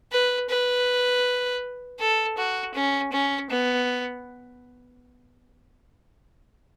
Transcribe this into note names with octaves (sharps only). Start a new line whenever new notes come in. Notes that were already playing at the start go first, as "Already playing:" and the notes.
B4
B4
A4
F#4
C#4
C#4
B3